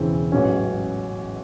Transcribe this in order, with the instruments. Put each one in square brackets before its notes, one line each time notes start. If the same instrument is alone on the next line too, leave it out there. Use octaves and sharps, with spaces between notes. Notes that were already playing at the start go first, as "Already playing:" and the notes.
Already playing: [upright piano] E1 E2 C#3 E3 C4
A1 G#2 F#3 C#4